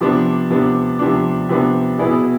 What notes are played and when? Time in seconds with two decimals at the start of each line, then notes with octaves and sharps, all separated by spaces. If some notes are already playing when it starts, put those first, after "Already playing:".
0.01 C3 F3 B3 D4
0.50 C3 F3 B3 D4
0.99 C3 F3 B3 D4
1.49 C3 F3 B3 D4
1.98 B2 B3 E4 G#4